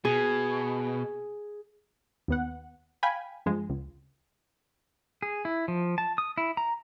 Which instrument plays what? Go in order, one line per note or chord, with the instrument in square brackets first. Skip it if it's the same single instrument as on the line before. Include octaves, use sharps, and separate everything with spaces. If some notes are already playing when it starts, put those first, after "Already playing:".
[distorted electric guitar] B2 [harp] G#4
[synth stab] D#2 B3 F#5
F5 G5 G#5 B5
G2 F3 G#3
C#2
[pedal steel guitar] G#4
E4
F3
A5
D#6
E4
A#5